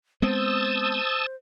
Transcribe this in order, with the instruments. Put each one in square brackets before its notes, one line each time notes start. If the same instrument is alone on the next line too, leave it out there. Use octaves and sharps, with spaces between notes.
[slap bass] G#3 B3 C4 [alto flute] C5 [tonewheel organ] A5 D#6 E6